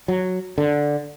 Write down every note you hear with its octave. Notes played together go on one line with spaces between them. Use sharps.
F#3
D3